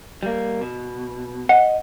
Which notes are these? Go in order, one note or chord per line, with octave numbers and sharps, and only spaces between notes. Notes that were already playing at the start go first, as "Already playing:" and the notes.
G3 A#3
B2
D#5 F#5